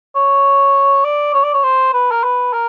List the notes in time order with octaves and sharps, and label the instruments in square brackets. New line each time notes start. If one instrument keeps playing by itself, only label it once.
[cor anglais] C#5
D5
C#5
D5
C#5
C5
B4
A#4
B4
A#4